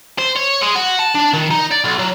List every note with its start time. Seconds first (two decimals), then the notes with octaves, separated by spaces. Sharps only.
0.18 C5
0.36 C#5
0.62 G#3
0.75 F#4
0.99 A5
1.15 D4
1.34 D#3
1.51 D#4
1.72 D5
1.85 B1
1.99 F#3